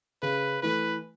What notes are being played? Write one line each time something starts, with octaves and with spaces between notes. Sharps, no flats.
C#3 B4
E3 A3 B4